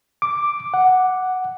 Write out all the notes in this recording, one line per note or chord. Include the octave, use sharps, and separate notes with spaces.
D6
F#5